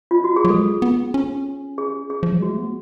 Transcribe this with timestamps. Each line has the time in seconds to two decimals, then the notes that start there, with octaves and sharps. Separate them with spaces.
0.11 F4
0.24 F#4
0.36 G#4
0.45 F#3
0.50 G#3 A4
0.82 B3
1.14 C#4
1.78 G#4
2.10 G#4
2.23 F3
2.32 F#3
2.40 G#3 F#4
2.49 A3
2.58 B3